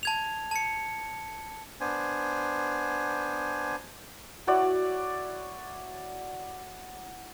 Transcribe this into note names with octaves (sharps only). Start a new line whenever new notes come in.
A5 G#6 F7
A5 C#7
B3 D4 C5 G#5
E4 F#4 C#5 D5